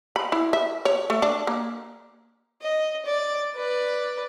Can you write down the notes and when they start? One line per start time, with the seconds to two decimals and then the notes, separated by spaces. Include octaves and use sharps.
0.16 B5
0.32 E4
0.53 E5
0.85 C#5
1.10 A3
1.22 D4
1.47 A#3
2.62 D#5
3.05 D5
3.56 B4 D5